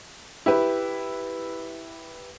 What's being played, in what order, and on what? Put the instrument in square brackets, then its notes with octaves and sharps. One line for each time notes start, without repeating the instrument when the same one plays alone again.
[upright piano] E4 G4 B4